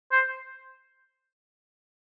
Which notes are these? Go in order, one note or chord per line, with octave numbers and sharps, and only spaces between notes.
C5